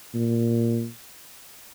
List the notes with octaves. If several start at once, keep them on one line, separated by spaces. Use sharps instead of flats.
A#2